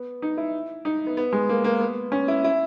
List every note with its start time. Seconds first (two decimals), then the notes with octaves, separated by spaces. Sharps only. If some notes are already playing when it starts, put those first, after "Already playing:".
Already playing: B3
0.22 D#4
0.37 E4
0.85 D#4
1.07 B3
1.17 B3
1.33 G#3
1.49 A#3
1.64 A#3
1.81 B3
2.12 C#4
2.28 E4
2.44 E4